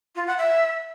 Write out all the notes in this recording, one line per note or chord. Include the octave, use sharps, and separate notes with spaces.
F4
F#5
E5